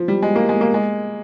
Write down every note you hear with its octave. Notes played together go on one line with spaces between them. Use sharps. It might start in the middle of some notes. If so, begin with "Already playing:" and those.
Already playing: F3
G3
G#3
A#3
G#3
A#3
G#3